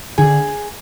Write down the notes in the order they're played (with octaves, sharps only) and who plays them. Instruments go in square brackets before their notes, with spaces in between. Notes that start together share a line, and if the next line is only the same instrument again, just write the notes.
[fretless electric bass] D3 [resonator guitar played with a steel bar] G#4